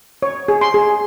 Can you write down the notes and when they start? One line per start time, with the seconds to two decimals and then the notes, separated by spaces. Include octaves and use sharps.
0.22 C#5
0.48 G#4
0.61 C6
0.74 G#4